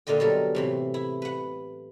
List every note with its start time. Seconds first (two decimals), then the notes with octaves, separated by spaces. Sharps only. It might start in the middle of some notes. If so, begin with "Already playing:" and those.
0.07 A#2 D3 F4 D#5 G5
0.20 B2 F#3 G3 A4 A#4
0.55 A2 C3 E3
0.94 E4
1.22 B4 F#5